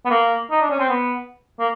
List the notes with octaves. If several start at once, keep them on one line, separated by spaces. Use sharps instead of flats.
B3
A#3
D#4
D4
C#4
C4
B3
A#3